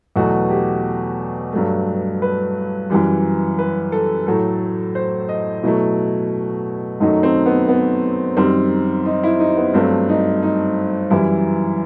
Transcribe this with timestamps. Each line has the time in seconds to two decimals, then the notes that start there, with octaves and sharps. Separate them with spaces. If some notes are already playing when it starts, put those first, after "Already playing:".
0.16 E2 B2 F#3 A3 F#4
0.50 G4
1.52 G2 F#3 A3
2.22 B4
2.90 F#2 E3 G3
3.59 B4
3.92 A4
4.26 A2 F#3 A3 A4
4.95 C5
5.29 D#5
5.63 B2 F#3 A3 E4
7.00 F#2 D#3 F#3 A3 D#4
7.23 C4
7.46 B3
7.68 B3
8.37 F#2 D#3 G3 C4
9.06 D#4
9.23 E4
9.40 D#4
9.57 B3
9.74 G2 F#3 A3 C4
10.09 D#4
10.43 D#4
11.10 F#2 E3 G3 E4